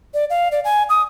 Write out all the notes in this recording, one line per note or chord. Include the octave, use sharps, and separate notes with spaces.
D5
F5
D5
G#5
D#6